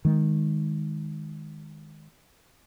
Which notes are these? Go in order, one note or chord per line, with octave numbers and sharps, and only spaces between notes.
D#3 G#3